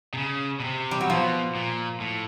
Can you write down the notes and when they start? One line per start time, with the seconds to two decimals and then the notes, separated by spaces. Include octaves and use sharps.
0.14 C3
0.18 C#3
0.60 B2
0.64 C3
0.91 G3
1.01 F#3
1.10 B2 F3
1.55 A#2
2.00 A2